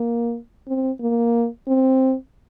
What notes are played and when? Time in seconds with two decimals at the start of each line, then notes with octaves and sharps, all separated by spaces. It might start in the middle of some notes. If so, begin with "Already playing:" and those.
Already playing: A#3
0.68 C4
1.00 A#3
1.68 C4